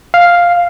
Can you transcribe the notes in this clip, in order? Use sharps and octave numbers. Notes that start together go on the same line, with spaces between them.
F5